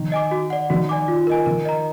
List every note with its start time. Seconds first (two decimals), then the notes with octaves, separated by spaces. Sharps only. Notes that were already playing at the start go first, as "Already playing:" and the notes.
Already playing: D#3
0.12 D#5 G#5 D6
0.31 F#4
0.50 D5 F#5
0.70 D#3 F#4
0.89 D5 G#5 D6
1.08 F4
1.27 A#4 D#5 G#5
1.46 D#3 A#4
1.65 D#5 A#5